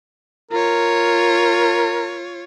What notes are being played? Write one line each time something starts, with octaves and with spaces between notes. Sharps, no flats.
F4 A#4 C#5